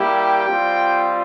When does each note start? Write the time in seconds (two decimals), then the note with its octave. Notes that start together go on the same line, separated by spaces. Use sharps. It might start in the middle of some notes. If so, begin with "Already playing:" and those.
Already playing: G3 A#3 E4 G4
0.15 G5
0.45 G3 C4 F4